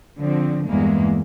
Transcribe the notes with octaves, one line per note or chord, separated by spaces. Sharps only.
D3 F3 C4
E2 G2 E3 G#3 A#3